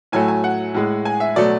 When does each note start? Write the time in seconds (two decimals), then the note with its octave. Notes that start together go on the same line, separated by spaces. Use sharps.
0.12 A2 F#3 A3 G#5
0.28 G#5
0.44 F#5
0.74 A2 G#3
1.05 G#5
1.20 E5
1.36 B2 F#3 A3 D5